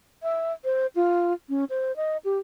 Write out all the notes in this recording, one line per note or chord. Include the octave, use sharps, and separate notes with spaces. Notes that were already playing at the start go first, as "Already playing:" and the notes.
E5
C5
F4
C#4
C5
D#5
G4